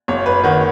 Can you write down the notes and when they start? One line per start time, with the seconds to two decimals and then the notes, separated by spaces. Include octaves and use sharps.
0.08 F#1 C#5
0.26 B4
0.44 D#3 F#4